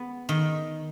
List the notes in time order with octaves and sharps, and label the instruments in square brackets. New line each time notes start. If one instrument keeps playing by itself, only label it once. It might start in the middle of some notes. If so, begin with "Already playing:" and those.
Already playing: [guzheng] B3
D#3